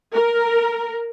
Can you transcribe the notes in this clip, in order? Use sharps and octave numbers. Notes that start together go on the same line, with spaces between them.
A#4